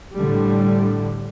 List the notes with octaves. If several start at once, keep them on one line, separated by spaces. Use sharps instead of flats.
A2 D3 G3